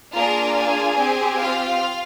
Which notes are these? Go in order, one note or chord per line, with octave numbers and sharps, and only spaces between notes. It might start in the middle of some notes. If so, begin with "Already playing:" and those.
A#3 D4 F4 G#4 A#4 A#5
G#4 G#5
C4 G4
F4 F5